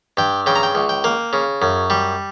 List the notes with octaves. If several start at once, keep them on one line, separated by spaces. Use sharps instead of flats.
G2 G5
C#3 G5
A#5
G5
C#2
G5
A#3
C#3
F#2
G3